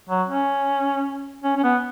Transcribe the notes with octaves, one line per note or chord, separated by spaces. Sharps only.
F#3
C#4
C#4
C#4
B3